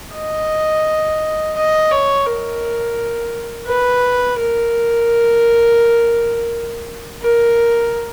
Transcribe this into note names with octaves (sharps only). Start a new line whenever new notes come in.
D#5
D#5
C#5
A#4
B4
A#4
A#4